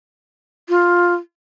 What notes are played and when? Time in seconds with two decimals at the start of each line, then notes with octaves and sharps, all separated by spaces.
0.69 F4